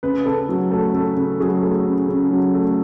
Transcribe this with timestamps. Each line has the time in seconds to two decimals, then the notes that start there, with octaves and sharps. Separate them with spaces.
0.03 C#3 B4
0.26 C#3 A4
0.49 F#3
0.71 A3 A4
0.94 C#3 A4
1.17 C#3
1.40 F#3 G#4
1.63 A3
1.85 C#3
2.08 C#3
2.31 F#3
2.54 A3